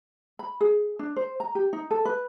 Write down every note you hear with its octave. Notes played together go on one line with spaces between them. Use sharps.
B5
G#4
D4
C5
A#5
G4
D#4
A4
B4